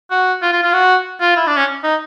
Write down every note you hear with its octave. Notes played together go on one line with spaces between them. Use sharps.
F#4
F4
F4
F4
F#4
F4
E4
D4
C#4
D#4